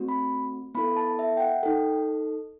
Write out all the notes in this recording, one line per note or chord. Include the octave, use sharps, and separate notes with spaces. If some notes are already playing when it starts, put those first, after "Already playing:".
Already playing: A3 C4 F#4
B5
B3 E4 A4 B5
A5
E5
G5
F#5
D#4 A4 G5